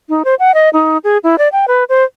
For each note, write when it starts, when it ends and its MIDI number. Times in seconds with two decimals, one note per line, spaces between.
0.09 0.23 63
0.25 0.35 72
0.39 0.54 78
0.54 0.69 75
0.73 0.98 63
1.04 1.18 68
1.24 1.36 64
1.38 1.48 74
1.52 1.66 79
1.68 1.84 71
1.89 2.04 72